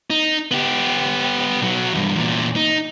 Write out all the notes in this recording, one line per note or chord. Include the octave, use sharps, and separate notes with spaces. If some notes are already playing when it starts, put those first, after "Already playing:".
D#4
B3 G4
B1 F#3
E2 G2
E2 A#2
D#4